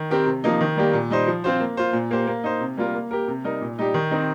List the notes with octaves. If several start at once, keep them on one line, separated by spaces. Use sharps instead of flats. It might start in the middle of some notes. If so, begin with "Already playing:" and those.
Already playing: D#3
C4 G4 A#4
C3
F3 A#3 D#4
D#3
G3 A#3 G4
A#2
G3 D#4 C5
F3
C4 F4 C5
A#3
F4 C5
A#2
A#3 G4 C5
A#3
D#4 C5
C3
G3 A#3 F4 A#4
A#3
G4 A#4
C3
G3 D#4 A#4
A#2
G3 D#4 G4
D#3
C4 D#4